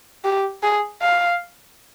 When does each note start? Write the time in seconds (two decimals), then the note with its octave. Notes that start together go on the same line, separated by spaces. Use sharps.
0.24 G4
0.63 G#4
1.02 F5